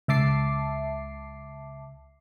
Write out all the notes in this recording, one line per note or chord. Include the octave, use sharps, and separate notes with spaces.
C#2 E5 A5 D6 C7